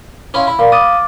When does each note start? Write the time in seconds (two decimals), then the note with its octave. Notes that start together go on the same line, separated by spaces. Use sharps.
0.34 C#4 E4 F4
0.47 E4 B5
0.59 A#2 F5
0.72 D6 D#6 F6 A6